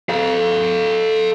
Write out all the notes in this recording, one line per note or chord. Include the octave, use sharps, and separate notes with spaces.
A4 F5